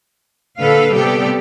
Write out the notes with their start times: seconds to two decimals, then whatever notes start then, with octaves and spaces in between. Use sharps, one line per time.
0.60 A#2 D3 A4 B4 F5
0.95 C3 G3 B3 G4 A4 D5